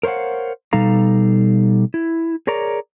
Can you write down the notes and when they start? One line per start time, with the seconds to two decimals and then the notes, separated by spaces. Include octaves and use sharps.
0.03 A#4 C5 C#5 F5 F#5
0.73 B2 G3 D#4 A4 F5 A#5
1.94 E4
2.47 G#4 A#4 C#5 D5 A#5